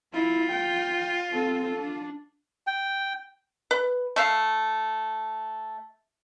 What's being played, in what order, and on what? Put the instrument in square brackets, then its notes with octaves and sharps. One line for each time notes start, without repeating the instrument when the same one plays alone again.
[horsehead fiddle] E4 [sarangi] F4
[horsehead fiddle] G5
C4 A4
D4
[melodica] G5
[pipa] B4
A3 E5 F5